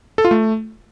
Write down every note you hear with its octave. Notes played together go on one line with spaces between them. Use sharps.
A4
F4
A3